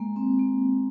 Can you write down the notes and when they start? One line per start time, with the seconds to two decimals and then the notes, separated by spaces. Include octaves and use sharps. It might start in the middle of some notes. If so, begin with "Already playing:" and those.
Already playing: G#3 A#3
0.16 C4
0.39 A#3